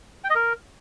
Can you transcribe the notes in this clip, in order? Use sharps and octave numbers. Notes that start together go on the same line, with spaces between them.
G5
D#5
A#4